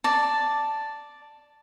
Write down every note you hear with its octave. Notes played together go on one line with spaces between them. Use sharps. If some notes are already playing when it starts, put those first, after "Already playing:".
D5 A5